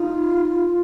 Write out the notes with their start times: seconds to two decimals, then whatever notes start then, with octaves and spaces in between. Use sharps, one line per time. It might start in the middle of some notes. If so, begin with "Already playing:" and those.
Already playing: D#4 F4